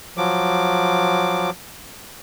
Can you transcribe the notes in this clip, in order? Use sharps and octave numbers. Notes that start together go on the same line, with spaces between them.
F3 F#3 D6